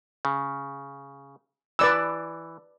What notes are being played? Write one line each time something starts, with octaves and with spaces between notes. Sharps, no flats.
C#3
E3 B4 D5 E6